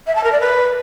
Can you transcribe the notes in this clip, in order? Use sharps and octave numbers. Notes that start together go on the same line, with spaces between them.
E5
A5
A#4
D5
B4